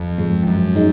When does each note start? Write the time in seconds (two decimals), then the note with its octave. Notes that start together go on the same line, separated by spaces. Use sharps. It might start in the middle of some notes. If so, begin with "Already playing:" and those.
Already playing: F2
0.18 G#2 F3 G#3
0.47 F#2
0.76 G#3 D#4